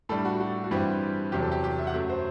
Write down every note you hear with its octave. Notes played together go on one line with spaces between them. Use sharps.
A2 G3 D4 A4
F#4
F#4
F#4
G2 E3 G3 C4 G4
E2 C3 F#3 G4
A4
G4
G4
E5
F#5
F#2 F#3 A3 E5
C5